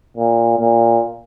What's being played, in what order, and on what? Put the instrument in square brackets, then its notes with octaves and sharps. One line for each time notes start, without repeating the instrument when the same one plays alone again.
[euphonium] A#2
A#2